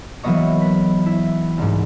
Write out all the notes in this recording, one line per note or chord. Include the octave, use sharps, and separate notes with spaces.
E3 F#3 A#3 B3 D#5 C#6
B4
E4
C2 G#2